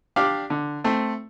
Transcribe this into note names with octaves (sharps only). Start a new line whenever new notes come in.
D4 G4 D5 F5
D3
A3 C4